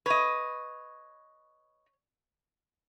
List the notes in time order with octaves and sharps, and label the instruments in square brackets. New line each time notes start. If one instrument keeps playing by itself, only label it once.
[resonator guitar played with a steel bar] B4 D#5 [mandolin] C#5